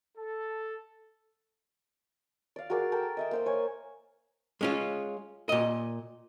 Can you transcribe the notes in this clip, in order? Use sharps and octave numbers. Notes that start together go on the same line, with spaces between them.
A4
D5 F5
F#4 G#4 A#4 D5
A4 A#4 G5
D#5 E5 D#6
A#3 C5 D#5
C5 C#5 G#5
G#3 C#4 F4
A#2 D#5